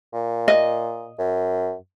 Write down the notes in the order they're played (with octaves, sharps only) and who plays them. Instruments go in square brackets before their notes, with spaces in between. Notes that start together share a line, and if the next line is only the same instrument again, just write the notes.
[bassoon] A#2
[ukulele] D#5
[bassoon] F#2